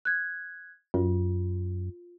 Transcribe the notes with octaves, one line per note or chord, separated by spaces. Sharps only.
F#6 G#6
F#2 F4